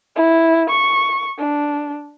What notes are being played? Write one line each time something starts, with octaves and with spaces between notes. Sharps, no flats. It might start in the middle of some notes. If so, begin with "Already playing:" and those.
E4
C#6
D4